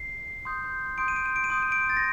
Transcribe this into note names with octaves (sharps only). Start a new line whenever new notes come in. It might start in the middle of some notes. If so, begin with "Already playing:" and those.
Already playing: C7
C6 D#6 G6
C6 D#6 G6 D7
D#7
D7
D#7
D7
D#7
C6 D#6 G6 D7
D#7
D7
A6
A#6